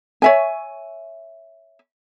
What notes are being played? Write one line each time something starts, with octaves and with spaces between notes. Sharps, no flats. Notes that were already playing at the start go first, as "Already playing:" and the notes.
C#5 E5 G#5